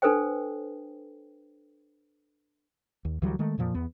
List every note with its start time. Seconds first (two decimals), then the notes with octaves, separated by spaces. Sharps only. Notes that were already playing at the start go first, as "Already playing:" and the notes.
0.02 D4 A4 B4 C5 G5
3.05 D#2
3.22 D2 E3 F#3 G3
3.39 D#3 G#3 A3
3.58 F2 A#2 F3
3.74 E2 B3